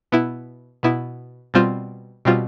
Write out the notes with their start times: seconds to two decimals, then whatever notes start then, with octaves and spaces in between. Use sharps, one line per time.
0.12 B2 B3 E4
0.83 B2 B3 E4
1.54 B2 G3 C4 F4
2.25 B2 G3 C4 F4